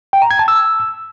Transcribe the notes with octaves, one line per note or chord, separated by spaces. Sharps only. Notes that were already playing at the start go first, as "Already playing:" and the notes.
G5
A#5
G#6
A5
E6